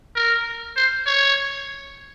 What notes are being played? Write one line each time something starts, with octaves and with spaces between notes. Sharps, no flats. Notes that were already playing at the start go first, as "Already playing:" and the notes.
A#4
C5
C#5